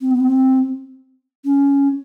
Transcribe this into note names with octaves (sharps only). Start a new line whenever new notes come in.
C4
B3
C4
C#4